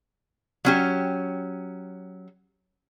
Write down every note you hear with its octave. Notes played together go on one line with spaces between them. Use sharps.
F#3 C#4 G4